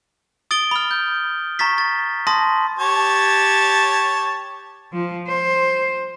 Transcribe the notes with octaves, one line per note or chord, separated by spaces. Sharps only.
D#6 A6 D7 G7
B5 F6
G6
A#5 C#6 A6 B6
A6
A5 C6 D#6 A#6
G4 C#5 A5
F3
C5